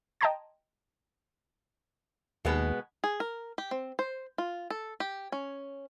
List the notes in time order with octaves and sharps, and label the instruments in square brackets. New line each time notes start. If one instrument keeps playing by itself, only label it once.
[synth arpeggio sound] D#5 G5 A5 A#5 C6 G#6
[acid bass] D#2 [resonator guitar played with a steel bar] B2 G#3 B3
[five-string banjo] G#4
A#4
G4
C4
C5
F4
A4
G4
C#4